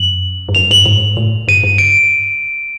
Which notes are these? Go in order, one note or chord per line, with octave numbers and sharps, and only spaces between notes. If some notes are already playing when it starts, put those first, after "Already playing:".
Already playing: F#2 F#7
G2
F#2 F7
G2 F#7
G#2
A2
G2 D#7
G2
D7